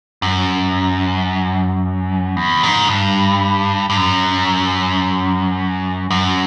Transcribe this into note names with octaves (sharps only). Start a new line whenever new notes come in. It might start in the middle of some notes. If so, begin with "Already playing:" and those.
F#2
E2
G#2
G2
G2
F#2
F#2